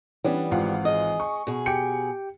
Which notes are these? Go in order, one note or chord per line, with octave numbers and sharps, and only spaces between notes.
E3 G3 B3 C#4 D4
G#1 F4 F#5
G#4 D#5
C#6
B2 G#4
G4 G5 C#7